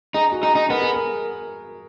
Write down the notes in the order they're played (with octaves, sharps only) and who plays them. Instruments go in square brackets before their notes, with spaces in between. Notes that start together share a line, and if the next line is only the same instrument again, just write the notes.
[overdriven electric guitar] D#4 [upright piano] G#4
[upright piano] F#4
[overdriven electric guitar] D#4 [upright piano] G#4
[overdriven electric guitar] D#4
[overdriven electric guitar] B3 [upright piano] A#4
[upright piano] G#4
A#4